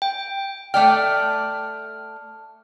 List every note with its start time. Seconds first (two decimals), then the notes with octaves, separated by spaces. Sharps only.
0.02 G5
0.74 A3 D5 G5 F6